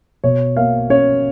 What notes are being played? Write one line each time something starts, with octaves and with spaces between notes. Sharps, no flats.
B2 C#5
A#3 F5
C#4 C#5